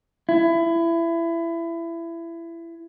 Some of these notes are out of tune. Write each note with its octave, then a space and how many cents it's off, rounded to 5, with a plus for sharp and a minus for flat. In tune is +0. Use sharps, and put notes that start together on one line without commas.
E4 +25